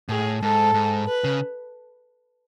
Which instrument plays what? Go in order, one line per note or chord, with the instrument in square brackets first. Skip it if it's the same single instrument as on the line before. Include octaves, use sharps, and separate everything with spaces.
[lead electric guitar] A2 [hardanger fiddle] G#4
[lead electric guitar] G#2 [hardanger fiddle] A4
[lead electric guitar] G#2
[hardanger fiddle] B4
[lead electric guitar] C#3